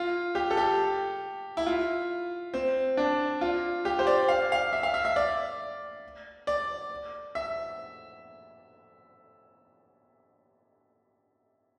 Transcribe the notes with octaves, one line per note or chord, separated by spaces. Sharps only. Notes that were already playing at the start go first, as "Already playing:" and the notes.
Already playing: F4
G4
A4
G4
E4
F4
C4
D4
F4
G4
C5
D5
F5
F5
E5
F5
E5
E5
D5
D5
E5